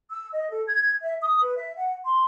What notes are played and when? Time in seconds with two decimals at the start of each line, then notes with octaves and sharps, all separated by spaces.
0.09 E6
0.31 D#5
0.49 A4
0.67 G#6
1.02 E5
1.21 D#6
1.41 B4
1.56 E5
1.75 F#5
2.04 C6